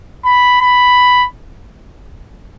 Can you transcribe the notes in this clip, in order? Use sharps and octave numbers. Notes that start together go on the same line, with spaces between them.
B5
B5